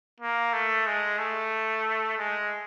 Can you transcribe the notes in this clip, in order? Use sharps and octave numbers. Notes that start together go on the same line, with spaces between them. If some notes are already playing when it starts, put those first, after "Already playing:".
A#3
A3
G#3
A3
G#3